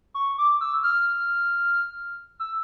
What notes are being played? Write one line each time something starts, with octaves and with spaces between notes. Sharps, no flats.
C#6
D6
E6
F6
E6